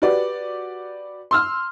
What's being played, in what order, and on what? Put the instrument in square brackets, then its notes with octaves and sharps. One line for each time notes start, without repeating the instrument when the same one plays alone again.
[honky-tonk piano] F#4 G4 B4 D5
C6 E6 F6